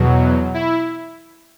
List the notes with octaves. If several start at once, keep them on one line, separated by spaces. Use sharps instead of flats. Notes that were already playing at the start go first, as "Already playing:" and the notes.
Already playing: E2 B2 F#3
E4